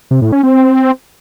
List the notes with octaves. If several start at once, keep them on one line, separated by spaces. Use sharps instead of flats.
C3
A2
C#4
C4